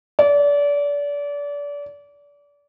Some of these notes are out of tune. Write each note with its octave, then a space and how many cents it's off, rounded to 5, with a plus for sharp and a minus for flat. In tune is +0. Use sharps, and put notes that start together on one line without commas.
D5 -30